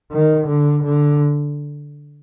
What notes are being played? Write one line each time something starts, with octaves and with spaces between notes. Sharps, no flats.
D#3
D3
D3